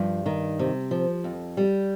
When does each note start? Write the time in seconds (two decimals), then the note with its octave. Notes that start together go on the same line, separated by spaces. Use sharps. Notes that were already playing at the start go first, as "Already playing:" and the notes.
Already playing: G2 F3
0.26 D#3
0.59 C3
0.91 F3
1.24 F2
1.57 G3